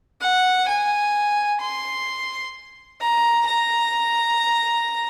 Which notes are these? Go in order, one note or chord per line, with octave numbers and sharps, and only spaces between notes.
F#5
G#5
C6
A#5
A#5